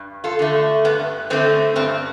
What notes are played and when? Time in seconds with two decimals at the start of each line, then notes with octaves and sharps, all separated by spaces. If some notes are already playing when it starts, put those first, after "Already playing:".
Already playing: G2
0.24 F4 A4
0.39 D3 A3
0.85 G2 B3
1.30 D3 A3 C4
1.76 G2 C4